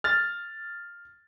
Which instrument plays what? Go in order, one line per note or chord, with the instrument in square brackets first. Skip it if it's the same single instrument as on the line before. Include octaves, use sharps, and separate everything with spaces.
[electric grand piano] F6 A6